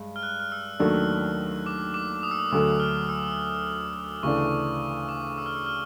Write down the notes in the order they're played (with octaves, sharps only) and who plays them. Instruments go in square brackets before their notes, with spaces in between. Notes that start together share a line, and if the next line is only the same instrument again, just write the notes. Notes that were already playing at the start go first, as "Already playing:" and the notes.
Already playing: [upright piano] G2 G#3
[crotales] F6
F#6
F6
E6
[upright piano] D#2 D#3 F#3 A3 D4 [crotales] E6
[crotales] D6
D6
D#6
E6
D#6
[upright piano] D2 D3 F#3 A3 [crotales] E6
[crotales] F6
E6
[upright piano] D2 C#3 E3 A3 D4 [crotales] C#6
[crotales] D6
E6
F6
E6
F6